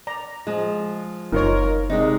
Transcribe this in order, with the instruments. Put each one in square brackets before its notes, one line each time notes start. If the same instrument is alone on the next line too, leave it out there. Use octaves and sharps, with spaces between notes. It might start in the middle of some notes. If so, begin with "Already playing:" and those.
[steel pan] D5 A#5
[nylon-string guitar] F3 G#3
[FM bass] F#1 [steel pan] D#4 F4 C#5 [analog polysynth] A#4
[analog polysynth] C3 [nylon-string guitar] G#3 D4 D#4